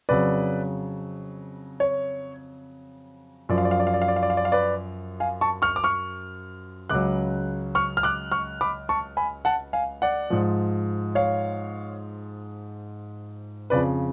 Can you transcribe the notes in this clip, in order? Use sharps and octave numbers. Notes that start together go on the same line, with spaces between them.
F2 C#3 F#3 B4 D5
C#5
F#2 F3 D5
F5
D5
F5
D5
F5
D5
F5
D5
F5
D5
F5
D5
F5
B4 D5
F5 G#5
A5 C#6
C#6 F6
D6
C#6 F6
C#2 C#3 F#3 D6 F#6
C#6 F6
F6
D6 F#6
C#6 F6
B5 D6
A5 C#6
G#5 B5
F#5 A5
F5 G#5
D5 F#5
G#2 F3
C#5 F5
F2 C#3 F3 B4 D5